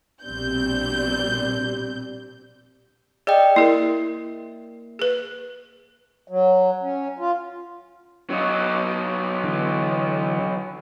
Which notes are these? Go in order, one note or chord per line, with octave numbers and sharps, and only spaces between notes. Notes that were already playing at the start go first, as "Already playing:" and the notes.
A#1 B2 G3 C4 D4 G6
G#4 D5 D#5 G5
A#3 E4 G#4 A#4
G#4 B4
F#3
C#4
F4
F#3 D#4
D3 E3